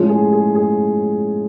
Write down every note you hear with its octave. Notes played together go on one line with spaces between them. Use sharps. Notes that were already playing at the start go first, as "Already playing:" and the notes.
Already playing: A2 F3 G#3 C#4
G#4
G#4
G#4